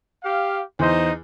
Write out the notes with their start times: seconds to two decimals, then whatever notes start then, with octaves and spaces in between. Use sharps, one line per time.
0.22 G4 F5
0.79 E2 D#4 C5